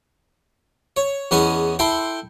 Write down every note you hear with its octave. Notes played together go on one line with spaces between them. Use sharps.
C#5
E2 B3 C#4 G#4 D#5
E4 A4 G5 C6